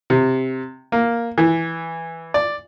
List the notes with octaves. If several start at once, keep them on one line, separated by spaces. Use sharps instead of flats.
C3
A#3
E3
D5